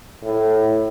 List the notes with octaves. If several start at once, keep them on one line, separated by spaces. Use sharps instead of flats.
A2